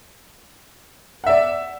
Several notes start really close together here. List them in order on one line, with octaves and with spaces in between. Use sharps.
F#5 E5 D5